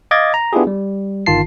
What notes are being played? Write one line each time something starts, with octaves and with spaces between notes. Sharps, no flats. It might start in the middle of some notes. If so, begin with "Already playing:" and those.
D#5 F5 D6 G#6 A6
A#5
B3 D4 E4 F4 G4 G#4
G3
G1 D#3 F4 A5 C7